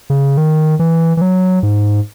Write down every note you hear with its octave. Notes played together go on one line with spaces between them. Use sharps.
C#3
D#3
E3
E3
F#3
G#2